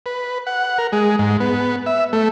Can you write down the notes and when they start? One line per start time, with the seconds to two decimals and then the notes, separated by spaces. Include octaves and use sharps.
0.06 B4
0.47 F#5
0.78 A#4
0.92 G#3
1.19 G#2
1.40 B3
1.86 E5
2.13 A3